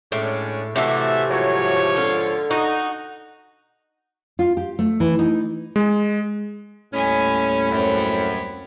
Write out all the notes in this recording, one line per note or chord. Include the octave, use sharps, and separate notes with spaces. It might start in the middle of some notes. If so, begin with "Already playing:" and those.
A2 G#3 C#4 D4
A2 C3 E3 A3 F#4 E5
G#2 F3 F#3 C#5
D3 F4
D#4 F#4
F4
G4
A3
E3
D#4
G#3
D#2 A2 G3 C#4 D#5 G#5 B5
F#2 C4 C#5